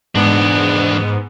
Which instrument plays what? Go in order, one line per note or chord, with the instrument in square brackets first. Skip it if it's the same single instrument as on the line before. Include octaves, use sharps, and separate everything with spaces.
[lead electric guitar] E2 D4 [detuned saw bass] G#2 [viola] B3